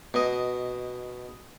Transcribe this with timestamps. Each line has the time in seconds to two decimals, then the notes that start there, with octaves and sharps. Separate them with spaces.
0.14 B2 D#5